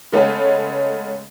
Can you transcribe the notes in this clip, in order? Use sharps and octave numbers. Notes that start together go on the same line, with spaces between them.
C#3 G#3 A3 B3 C#4